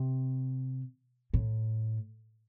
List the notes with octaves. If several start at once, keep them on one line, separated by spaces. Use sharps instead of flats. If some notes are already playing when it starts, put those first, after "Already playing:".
Already playing: C3
A2